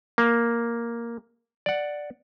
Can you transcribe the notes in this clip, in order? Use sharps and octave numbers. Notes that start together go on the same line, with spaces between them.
A#3
D5 F#5